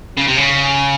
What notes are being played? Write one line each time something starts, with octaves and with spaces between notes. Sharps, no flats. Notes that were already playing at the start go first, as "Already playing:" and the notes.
C#3
C3
C#3